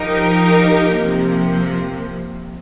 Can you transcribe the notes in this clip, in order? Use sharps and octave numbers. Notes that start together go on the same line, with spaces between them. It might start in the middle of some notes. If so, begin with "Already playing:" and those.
Already playing: F3 D#4 G4 A#4
C3 F3 A#3